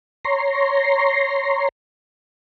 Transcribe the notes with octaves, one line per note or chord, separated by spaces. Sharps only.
C#5 A#5 C6